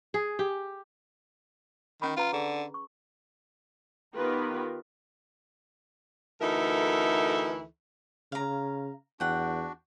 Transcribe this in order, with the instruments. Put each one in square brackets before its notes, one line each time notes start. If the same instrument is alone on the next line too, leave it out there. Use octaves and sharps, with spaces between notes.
[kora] G#4
G4
[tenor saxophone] D#3 [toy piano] C#4 B5
[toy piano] C#4 B4 A#5 [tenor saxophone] F4
[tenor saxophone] D3 [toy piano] G#4
[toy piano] C#6
[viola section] D#3 B3 F4 G4 A#4 B4
[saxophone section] D2 E3 D#4 A4 A#4 E5
[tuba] C#3 [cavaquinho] F5 A#5
[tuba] E2 [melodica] D4 F#4 [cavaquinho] F#5 G5